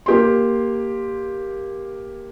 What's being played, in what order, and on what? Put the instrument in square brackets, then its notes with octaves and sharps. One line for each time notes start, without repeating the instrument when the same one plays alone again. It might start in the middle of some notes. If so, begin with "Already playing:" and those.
[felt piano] A#3 G4 C6